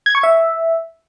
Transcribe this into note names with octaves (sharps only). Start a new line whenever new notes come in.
G#6
C#6
E5